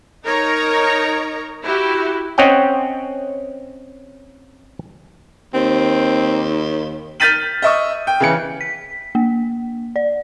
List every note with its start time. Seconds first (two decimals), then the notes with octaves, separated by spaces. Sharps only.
0.23 D#4 A#4 C#5 A#5
1.63 E4 F#4 G4
2.38 C4 C#4 C#5 D#5 F#5 G5
5.54 D#2 C4
7.20 F6 G6 A6 B6 D#7 F#7
7.62 D#5 E5 C#6 D#6
8.07 G5
8.20 C#3 E3 C#7
8.61 B6
9.15 A#3
9.96 D5